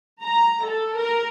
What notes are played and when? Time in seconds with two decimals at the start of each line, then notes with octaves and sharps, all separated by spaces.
0.23 A#5
0.63 A4
0.97 A#4